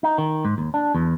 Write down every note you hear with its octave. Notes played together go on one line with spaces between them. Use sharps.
D#4
D#3
G#2
D#2
D4
E2